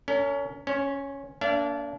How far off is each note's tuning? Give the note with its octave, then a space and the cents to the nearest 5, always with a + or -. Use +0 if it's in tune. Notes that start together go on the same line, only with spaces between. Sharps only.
C#4 +25 A#4 -35
C#4 +0 C5 +45
A#3 +0 D4 -30 E5 +45